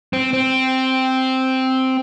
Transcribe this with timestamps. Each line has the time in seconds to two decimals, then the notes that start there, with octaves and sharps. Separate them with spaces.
0.13 C4
0.33 C4